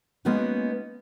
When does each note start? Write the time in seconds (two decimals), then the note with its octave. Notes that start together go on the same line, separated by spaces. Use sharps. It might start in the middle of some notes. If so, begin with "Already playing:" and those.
0.25 G#3 A#3 B3 C#4 D#4 F#4